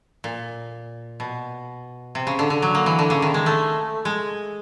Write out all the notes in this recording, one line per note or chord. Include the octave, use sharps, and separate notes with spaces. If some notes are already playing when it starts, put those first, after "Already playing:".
A#2
B2
C3
C#3
D3
D3
F#3
A#3
E3
D3
C#3
D#3
G#3
A3
G#3